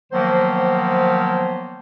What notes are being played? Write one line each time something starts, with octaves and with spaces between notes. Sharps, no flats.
D#3 F3 F#3 A#3 B3 C5